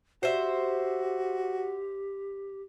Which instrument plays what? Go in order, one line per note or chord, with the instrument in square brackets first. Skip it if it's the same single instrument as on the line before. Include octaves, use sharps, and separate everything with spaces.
[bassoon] F#4 [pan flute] G4 [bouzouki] C5 E5